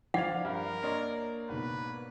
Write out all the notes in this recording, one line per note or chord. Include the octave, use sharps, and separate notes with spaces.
F3 D4 D5 F5 F#5 G#6 F7
G2 A#4
A#3 D4 C#5 D#5 C6
G#2 B2 B4